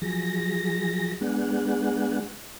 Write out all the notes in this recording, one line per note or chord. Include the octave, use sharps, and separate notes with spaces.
F3 F#3 G#4 A#6
G#3 B3 D4 G#4 F#5